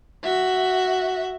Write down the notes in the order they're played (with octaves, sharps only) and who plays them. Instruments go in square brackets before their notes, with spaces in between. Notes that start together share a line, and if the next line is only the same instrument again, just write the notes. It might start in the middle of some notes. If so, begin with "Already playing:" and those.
[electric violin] F#4 E5